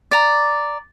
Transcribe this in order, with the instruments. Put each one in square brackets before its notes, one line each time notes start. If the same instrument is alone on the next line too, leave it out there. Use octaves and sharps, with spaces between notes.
[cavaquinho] D5 A#5